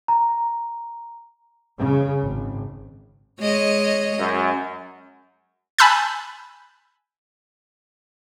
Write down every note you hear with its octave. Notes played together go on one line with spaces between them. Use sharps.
A#5
C#3
G#1
G#3 C#5 D#5
F#2
G#5 A5 B5 E6 F#6 G6